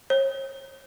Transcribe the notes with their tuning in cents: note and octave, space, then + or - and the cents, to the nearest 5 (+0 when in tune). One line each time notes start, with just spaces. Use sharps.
C#5 -40